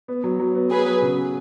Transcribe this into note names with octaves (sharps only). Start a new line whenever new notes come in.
B3
F#3
F#3
B3
B3 G#4 B4
F#3
C#3